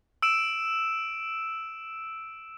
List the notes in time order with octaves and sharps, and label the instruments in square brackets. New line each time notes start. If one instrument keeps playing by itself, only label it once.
[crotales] E6 D7 E7